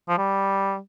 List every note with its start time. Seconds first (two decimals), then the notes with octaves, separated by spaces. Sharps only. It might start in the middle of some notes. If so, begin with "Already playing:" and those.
0.08 F3
0.18 G3